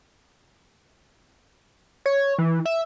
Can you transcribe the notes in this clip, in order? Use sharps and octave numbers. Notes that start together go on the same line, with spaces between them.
C#5
E3
E5